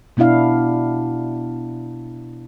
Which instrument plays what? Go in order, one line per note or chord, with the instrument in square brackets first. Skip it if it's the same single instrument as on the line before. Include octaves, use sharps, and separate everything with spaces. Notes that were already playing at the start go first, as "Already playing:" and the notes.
[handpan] B2 B3 D4 E4 F5